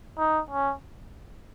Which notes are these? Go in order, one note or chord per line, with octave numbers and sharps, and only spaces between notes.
D#4
C#4